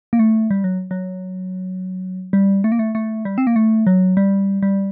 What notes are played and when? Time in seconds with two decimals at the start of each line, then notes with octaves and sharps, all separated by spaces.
0.13 A#3
0.19 A3
0.51 G3
0.64 F#3
0.91 F#3
2.33 G3
2.64 A3
2.72 A#3
2.79 A3
2.95 A3
3.25 G3
3.38 C4
3.47 A#3
3.56 A3
3.87 F#3
4.17 G3
4.63 G3